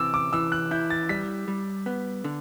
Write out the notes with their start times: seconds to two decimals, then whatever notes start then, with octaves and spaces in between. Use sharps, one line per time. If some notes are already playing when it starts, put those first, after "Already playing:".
Already playing: C3 E3 D6 E6
0.14 D6
0.33 E3 E6
0.52 F#6
0.71 E4 G6
0.90 A6
1.09 G3 B6
1.48 G3
1.86 B3
2.24 D3